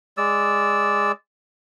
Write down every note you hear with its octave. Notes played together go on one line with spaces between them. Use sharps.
G#3 D5 E6